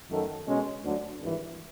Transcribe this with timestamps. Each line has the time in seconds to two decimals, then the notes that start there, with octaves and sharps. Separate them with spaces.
0.10 F#2 D#3 F#3 A3
0.47 B2 G#3 C#4
0.83 D2 D3 F#3
1.20 G#1 G2 E3